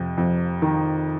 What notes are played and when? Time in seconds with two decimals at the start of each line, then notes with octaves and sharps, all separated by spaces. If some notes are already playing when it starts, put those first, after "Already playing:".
Already playing: F2 C3
0.18 F2
0.62 D#3